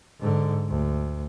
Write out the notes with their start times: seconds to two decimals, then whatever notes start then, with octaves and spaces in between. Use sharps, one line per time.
0.20 G#2 D3
0.69 D2